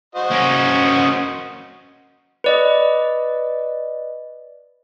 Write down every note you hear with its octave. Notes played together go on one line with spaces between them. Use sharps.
F#4 C5 D#5
A#3 C#4
B4 D5 D#5